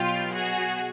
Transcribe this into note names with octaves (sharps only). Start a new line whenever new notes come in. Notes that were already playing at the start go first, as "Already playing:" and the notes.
Already playing: B2 F#3 F4 G4
F#4 G#4